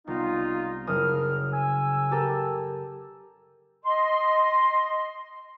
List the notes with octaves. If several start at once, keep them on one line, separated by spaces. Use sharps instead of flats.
C2 B3 D#4 F4
F#1 C#3 A#4 D#6 F6
G#5 E6
G4 A4 A#4
D#5 C6